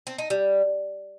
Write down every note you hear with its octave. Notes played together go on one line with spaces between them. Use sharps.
C4
D#4
G3